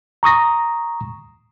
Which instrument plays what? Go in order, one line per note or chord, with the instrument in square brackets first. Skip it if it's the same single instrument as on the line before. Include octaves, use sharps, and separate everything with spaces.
[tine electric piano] A#5 C#6 D#6 A#6